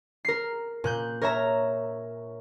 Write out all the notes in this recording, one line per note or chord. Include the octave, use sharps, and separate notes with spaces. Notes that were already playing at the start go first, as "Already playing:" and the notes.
A#4 C7
A#2 F#6 G6
A#4 C#5 E5 A#5